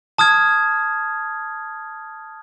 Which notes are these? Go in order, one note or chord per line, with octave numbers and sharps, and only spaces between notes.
A5 D#6 F6 G#6